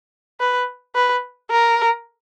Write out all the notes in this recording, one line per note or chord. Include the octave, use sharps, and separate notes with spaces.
B4
B4
A#4